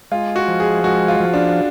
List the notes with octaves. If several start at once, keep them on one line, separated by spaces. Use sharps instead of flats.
G#3 F4
F#4
F3
G#4
G#3 F#4
F4
F3
D4